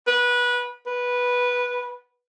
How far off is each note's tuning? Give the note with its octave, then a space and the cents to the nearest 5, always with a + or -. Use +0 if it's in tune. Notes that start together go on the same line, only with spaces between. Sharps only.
B4 -20
B4 -10